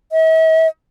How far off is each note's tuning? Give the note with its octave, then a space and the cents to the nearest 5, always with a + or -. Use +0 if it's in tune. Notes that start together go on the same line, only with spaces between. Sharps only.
E5 -45